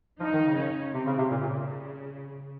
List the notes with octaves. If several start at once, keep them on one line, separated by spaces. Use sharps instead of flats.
F3 D#4
D#3
C#3
C#4
C3 C4
C#3
C3
A#2 C#3
A#2